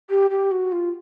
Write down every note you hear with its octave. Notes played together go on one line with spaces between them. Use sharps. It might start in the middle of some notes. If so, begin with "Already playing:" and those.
G4
G4
F#4
F4